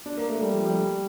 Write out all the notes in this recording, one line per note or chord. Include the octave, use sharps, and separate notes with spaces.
D4
A#3
A3
G3
F3
G3